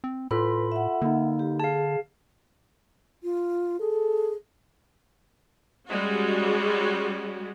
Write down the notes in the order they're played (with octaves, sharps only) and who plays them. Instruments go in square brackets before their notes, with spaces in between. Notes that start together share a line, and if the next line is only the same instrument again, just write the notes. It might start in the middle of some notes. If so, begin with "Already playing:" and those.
[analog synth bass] C4
[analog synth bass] A2 [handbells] F4 A4 B5 [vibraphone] B4 C6
[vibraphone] E5 F#5
[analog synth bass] D3 [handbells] A#3 D#4
[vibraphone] G4
[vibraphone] G#4 [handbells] F5 A5
[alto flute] F4
[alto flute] G#4 [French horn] A4
[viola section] G3 G#3 C#4 F#4